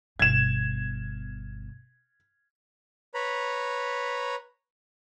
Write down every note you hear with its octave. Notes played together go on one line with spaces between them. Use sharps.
G1 B2 G#6 E7
B4 C#5 A#5 B5